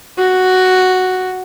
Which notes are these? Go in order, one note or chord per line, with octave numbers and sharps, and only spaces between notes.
F#4